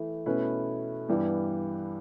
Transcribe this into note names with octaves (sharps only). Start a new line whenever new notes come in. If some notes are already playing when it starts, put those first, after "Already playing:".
Already playing: E3 A3 E4
B2 A3 C#4 E4 B4
G2 E3 G3 B3